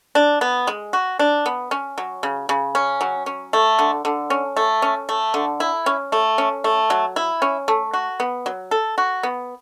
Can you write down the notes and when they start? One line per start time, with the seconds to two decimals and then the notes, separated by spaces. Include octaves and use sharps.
0.15 D4
0.41 B3
0.67 G#3
0.93 F#4
1.19 D4
1.46 B3
1.71 C#4
1.98 F#3
2.23 C#3
2.49 C#3
2.75 C#4
3.01 F#3
3.26 C#4
3.53 A3
3.79 D3
4.05 D3
4.30 C#4
4.56 A3
4.82 C#4
5.09 A3
5.34 D3
5.60 E4
5.86 C#4
6.12 A3
6.38 C#4
6.64 A3
6.90 F#3
7.16 E4
7.42 C#4
7.68 A3
7.93 F#4
8.20 B3
8.46 F#3
8.71 A4
8.98 F#4
9.23 B3